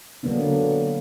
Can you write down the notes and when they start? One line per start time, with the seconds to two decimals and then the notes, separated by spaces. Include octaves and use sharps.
0.23 D3 F#3 A#3 B3 D4